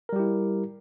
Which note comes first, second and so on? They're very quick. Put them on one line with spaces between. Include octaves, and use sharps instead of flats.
A#4 G3 G4 E4